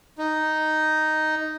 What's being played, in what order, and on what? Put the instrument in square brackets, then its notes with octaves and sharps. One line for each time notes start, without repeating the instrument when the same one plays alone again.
[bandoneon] D#4